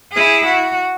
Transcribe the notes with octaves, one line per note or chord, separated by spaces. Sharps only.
E4 G#4
F#4